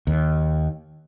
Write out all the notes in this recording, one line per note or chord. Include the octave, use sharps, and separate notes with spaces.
D#2